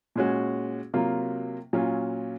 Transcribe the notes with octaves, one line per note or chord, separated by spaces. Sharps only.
A#2 G#3 C#4 F#4
C3 F#3 A#3 F4
A#2 F#3 C#4 F4